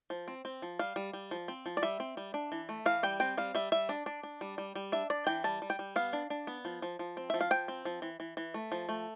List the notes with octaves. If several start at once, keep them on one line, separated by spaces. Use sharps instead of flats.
F3
C4
C4
F3
G3 F5
G3
G3
F3
C4
F3
D5
G3 E5
C4
G3
D4
E3
A3
E3 F5
G3 G5
C4 G5
G3 F5
G3 E5
G3 E5
D4
D4
D4
G3
G3
G3
D4 E5
D4 D5
E3 G5
G3 A5
G3
G5
G3
B3 F5
D4
D4
B3
F3
F3
F3
C4
F3 E5
F5
F3 G5
C4
F3
E3
E3
E3
A3
F3
A3